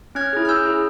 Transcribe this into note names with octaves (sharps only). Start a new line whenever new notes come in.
C#4 F6 G#6
E4 G#4
F6
C#4 E6 G6
E4 G#4